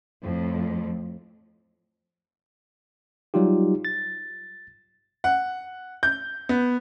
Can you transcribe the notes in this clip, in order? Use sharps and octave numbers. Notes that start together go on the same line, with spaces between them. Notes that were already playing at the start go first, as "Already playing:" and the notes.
F2 A2
F#3 G3 D#4 F4 G4
A6
F#5
G6
B3